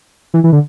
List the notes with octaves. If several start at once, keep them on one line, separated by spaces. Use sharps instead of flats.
E3
E3
D3